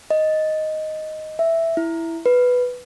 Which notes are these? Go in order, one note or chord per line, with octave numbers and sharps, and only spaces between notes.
D#5
E5
E4
B4